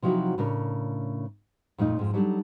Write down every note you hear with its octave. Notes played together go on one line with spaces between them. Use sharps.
C3 F3 F#3 D#4 E4 F#4
A2 C#3 D4 A#4
F2 A#2 A3 D#4
F2 G#2 F3
F#3 G3 D4 D#4 A4